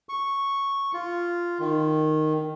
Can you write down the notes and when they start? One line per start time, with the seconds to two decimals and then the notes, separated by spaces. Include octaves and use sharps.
0.09 C#6
0.94 F4
1.59 D#3